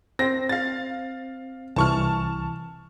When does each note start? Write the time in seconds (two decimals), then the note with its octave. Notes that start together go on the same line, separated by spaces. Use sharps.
0.19 C4 A#6
0.49 F5 A6
1.76 C2 E3 A5 C#6 F6